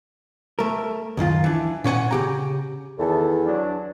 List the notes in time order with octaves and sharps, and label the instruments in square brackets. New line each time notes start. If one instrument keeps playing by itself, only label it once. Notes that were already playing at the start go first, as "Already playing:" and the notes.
[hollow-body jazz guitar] A3 A#4
C#2 F#2 D#3 F4
E3 D4
A#2 C#4 B4 F#5 G#5
C#3 G4 A#5
[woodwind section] E2 [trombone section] D#3 A4
[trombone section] F#3 D4